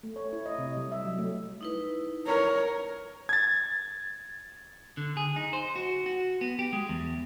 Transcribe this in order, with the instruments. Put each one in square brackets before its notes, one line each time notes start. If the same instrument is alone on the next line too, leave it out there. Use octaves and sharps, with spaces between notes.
[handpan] A3
C#5
E4
D#5
C3
G3
E5
F#3
A3
[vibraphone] D#4 E4 B4
[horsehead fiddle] A#4 C#5
[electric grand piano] G#6 A6
[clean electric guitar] D3
G#4
D#4
C5
F#4
F#4
B3
G4
G#3
E2